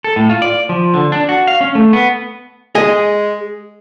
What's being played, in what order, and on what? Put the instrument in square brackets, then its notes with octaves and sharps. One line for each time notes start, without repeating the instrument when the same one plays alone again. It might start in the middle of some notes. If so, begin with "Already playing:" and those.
[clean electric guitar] A4
A2
F4
D5
F3
D3
D4
F#4
F5
C#4
A3
B3
[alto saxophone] G#3 [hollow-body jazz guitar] G#4 D#5 G#5